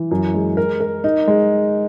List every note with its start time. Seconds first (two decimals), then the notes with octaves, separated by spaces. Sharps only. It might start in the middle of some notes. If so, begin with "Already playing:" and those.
Already playing: E3
0.11 F#2
0.34 G#3
0.57 A#4
0.81 A#4
1.04 D#4
1.28 G#3